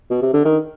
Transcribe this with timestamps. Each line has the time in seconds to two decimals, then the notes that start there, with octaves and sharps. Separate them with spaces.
0.10 B2
0.22 C3
0.33 D3
0.45 D#3